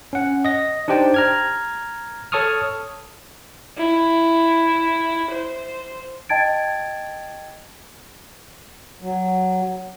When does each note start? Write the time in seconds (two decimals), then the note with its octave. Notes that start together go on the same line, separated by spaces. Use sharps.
0.13 C#4 F#5
0.45 D#5 A#6
0.88 D4 D#4 G4 C5 G5 A5
1.14 A#5 F6 G#6
2.32 A4 C#5 A5 C#6 D#6 F6
3.78 E4
5.31 C5
6.29 D#5 G5 A5 G#6 A6 D7
9.02 F#3